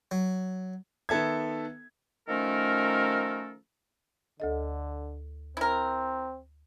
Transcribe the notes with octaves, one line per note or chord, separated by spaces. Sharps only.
F#3
D#3 B3 A4 E5 G#6
D#3 F3 A3 C#4 A4 A#4
D2 D3 A4 D#5
C4 E4 A#4